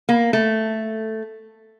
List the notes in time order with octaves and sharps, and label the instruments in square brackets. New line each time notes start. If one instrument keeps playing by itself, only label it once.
[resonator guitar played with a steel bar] A#3
A3